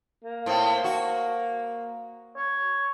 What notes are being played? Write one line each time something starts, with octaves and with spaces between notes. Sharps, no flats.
A#3
A2 C4
F#4
C#5